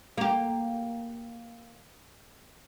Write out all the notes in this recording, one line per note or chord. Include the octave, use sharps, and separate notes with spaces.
A#3 G4